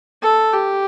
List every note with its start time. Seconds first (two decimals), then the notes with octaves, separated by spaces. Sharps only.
0.23 A4
0.53 G4